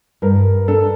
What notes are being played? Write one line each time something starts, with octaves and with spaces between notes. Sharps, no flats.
G2 A#4
D4 A4